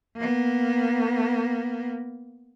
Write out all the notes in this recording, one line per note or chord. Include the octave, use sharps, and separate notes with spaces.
A#3 B3